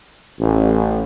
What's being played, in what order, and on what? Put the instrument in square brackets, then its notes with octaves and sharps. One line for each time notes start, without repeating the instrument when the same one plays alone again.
[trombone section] A1